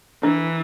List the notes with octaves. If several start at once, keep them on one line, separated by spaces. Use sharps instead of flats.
E3 D4